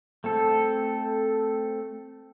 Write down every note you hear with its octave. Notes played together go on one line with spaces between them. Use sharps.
A3 C4 A4